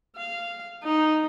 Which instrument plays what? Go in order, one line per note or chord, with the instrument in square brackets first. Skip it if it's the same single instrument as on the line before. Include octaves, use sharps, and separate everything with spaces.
[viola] F5
D#4